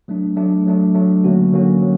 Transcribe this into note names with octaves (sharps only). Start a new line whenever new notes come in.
F#3 A3 D4
F#3 A3 D4
F#3 A3 D4
F#3 A3 D4
D3 F#3 A#3 C#4 F#4
D3 F#3 A#3 C#4 F#4
F#3